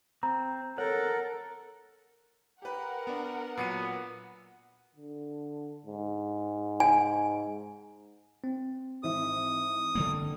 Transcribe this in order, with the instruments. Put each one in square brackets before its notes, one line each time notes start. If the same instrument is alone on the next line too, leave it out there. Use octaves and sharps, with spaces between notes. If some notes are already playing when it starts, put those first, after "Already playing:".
[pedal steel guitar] C4 [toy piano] A#5
[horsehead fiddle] A4 [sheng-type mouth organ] A#4 [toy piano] C#5 [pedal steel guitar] F#5
[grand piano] G4 B4 [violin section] A#4 F#5
[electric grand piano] B3 D4
[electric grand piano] A#2 F#3 [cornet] B3 [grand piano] C7 C#7 D#7
[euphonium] D3
G#2
[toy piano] G#5
[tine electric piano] C4
[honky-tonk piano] G#1 E3 E5 [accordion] D#6
[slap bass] D3 G3 A#3